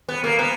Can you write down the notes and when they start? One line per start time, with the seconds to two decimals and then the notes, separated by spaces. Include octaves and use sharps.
0.09 B3
0.24 A#3
0.39 B3